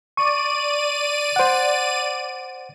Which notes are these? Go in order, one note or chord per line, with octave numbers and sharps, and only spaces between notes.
D5 C#6 D#7
C5 F#5